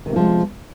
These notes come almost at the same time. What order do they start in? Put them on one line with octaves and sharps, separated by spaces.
D#3 C3 A#3 F3 G#3